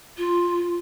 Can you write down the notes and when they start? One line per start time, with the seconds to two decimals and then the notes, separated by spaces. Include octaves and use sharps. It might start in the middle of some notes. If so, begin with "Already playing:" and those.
0.18 F4